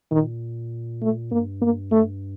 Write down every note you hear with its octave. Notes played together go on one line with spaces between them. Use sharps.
A#2 D#3
A3
G2 A#3
A#3
A3